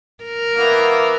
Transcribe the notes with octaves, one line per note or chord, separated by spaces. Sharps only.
A#4
E3 A#3 B3